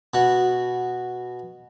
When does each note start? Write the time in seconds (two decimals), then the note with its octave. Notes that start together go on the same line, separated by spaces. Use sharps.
0.14 B2 F#4